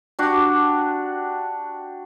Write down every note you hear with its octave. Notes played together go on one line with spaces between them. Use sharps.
D4 F#4 G4